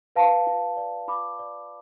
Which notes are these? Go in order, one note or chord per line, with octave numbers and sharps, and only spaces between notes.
B4 F5 A5
F4
D5
F4 B5 D6
D5